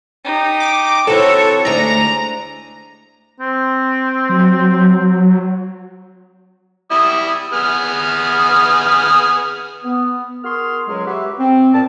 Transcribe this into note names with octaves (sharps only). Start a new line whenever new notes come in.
D#4 G4
D6
C3 E3 F#4 A4 C#5
D2 G#3 A3 D4 A#5
C4
F#3
G3 E4 D#6
B3 G#4 F6
B3
F#4 G#4 A#4 C6 F6
C#2 F#3 G#3
F#4 G4 B4 E5
C4
A#2 A5